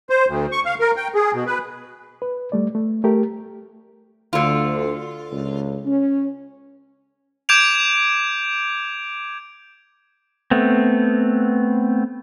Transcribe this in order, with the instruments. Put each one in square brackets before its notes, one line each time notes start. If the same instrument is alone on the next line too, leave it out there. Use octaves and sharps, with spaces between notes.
[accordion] C5
D2
C#6
F5
A#4
G5
G#4
B2
B4
[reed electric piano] B4
G3 A3 D5
A3
A3 G4 A#4
[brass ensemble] D2 [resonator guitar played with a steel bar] D3 F4
[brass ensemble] C#2
C#4
[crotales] D6 G6 G#6 D7 F7
[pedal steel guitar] A3 B3 C4